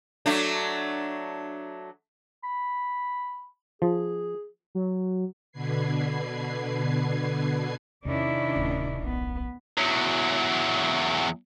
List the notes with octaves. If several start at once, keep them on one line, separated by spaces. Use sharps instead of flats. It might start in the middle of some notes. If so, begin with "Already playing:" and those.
F#3 A3 D4
B5
F3 G#4
F#3
B2 D3 B4 G#6 C7
E2 C3 D#3 C#4 D4 E4 D5
D1
A#1 B3
E2 F#3